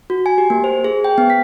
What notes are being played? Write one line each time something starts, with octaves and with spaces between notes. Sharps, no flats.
F#4
G#5
G4
A#3
C5
G#4
G5
B3
B6